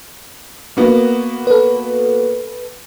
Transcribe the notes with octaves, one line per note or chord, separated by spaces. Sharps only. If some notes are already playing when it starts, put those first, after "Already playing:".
A#3 B3 F#4
A4 B4